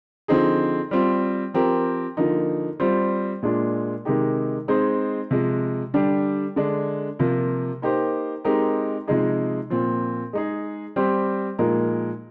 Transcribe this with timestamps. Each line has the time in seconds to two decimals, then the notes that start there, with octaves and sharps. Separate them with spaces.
0.28 D3 F3 C4 D#4 G#4
0.91 G3 C4 F4
1.54 F3 C4 G4 A#4
2.17 D3 F3 A#3 D#4
2.80 G3 C4 F4 C5
3.43 A#2 G#3 D4 F4
4.05 C3 D#3 G#3 D#4 G4
4.68 G#3 C4 D#4 G#4 C5
5.31 C3 F3 G#3
5.94 D3 G3 D4 G4
6.56 D3 G#3 D4
7.19 C3 F3 A#3 F4
7.82 A#3 D#4 G4 C5
8.45 G#3 C4 D#4 G4 A#4
9.07 C3 F3 G#3 D#4 G#4
9.70 A#2 F3 C4 F4
10.33 G#3 D#4 G#4
10.96 G3 C4 G4 C5
11.59 A#2 F3 G#3 D#4 A#4